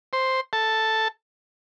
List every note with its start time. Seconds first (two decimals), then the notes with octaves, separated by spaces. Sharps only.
0.13 C5 C6
0.53 A4 A5